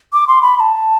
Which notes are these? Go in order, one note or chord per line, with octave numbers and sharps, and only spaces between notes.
D6
C6
B5
B5
A5